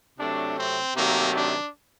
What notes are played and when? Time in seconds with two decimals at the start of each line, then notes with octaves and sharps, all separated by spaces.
0.19 C3 F#3 A3 D4
0.57 C4
0.96 C3 D#3 F#3 A3 A#3
1.34 D4